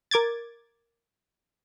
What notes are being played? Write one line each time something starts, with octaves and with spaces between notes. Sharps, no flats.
A#4 D6 G#6 A6